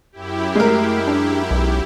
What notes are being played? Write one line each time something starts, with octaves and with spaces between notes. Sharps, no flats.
F#2 E4 G4
G#3 A3 A#4
D4
B1